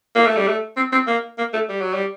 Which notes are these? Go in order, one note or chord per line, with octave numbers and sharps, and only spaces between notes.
A#3
A3
G3
A3
C4
C4
A#3
A#3
A3
G3
F#3
G3